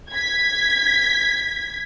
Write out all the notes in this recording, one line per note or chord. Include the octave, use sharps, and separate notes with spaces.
G#6 B6